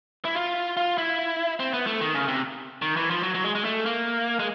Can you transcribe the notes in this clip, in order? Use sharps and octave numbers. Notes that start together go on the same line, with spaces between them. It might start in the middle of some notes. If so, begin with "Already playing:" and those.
E4
F4
F4
E4
C4
B3
A3
D#3
C#3
C3
D#3
E3
F3
F#3
F#3
G#3
G#3
A3
A#3
G#3